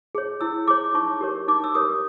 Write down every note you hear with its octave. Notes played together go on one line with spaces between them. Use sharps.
G#4 C#5
E4 E6
G#4 C#5 D6
D#4 C#6
G4 A#4 C#5
D#4 D6
E6
G4 A#4 C#5 D#6